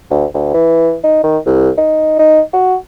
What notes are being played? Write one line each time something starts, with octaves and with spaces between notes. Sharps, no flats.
D2
D2
E3
D#4
D#3
C2
D#4
D#4
F#4